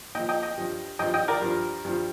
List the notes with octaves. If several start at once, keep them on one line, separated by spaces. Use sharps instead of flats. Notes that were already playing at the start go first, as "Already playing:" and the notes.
A#2 F3 D#5 G5
D#5 G5
D#5 G5
G2 F3
G2 F3 D#5 G5
D#5 G5
A#4 D5
G2 F3
G2 F3